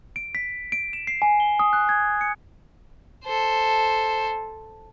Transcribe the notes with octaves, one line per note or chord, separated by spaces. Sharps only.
D7
B6
D7
E7
C7
G#5
G7
D#6
F#6
G#6
C#7
A4 C5